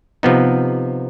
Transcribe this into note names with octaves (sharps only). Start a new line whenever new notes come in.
C3 F3 B3 D#4